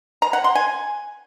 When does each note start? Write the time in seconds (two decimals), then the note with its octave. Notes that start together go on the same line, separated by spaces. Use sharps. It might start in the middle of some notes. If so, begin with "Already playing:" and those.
0.22 A#5
0.33 F#5
0.44 C6
0.55 G#5